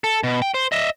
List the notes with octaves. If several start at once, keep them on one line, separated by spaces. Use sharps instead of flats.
A4
B2
G5
C5
D#5 E5